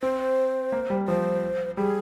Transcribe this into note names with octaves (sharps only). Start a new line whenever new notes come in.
C4 C5
A#3
G3
F3 C5
G3 G#4